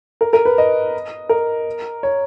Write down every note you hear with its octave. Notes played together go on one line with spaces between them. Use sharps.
A#4
A#4
B4
D#5
A#4
C#5